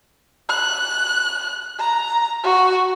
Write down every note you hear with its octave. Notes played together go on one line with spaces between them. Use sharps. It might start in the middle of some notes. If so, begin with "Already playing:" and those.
F#6
A#5
F#4